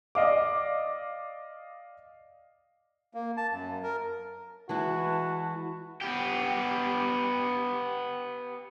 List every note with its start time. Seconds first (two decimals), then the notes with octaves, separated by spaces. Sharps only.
0.15 D5 D#5 F5 D6
3.14 A#3
3.37 A5
3.51 F#2
3.83 A#4
4.69 E3 G#3 E4 F#4 A5
6.01 B3 G4